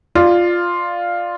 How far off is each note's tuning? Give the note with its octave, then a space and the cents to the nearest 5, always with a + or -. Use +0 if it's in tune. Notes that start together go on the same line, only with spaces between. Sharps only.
F4 +0 D5 +20